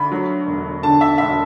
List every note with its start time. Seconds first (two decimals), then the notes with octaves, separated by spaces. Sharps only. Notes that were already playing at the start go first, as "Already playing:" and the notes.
Already playing: D2 B5
0.12 F#3
0.47 E1
0.83 D3 A5
1.01 E5
1.18 E1 E5